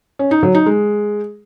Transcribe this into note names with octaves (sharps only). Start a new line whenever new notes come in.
C#4
D#4
F#3
D#4
G#3